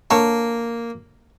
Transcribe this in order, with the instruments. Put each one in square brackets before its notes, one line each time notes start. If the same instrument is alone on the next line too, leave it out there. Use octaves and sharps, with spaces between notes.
[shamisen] D3 C#5 A5 [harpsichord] A#3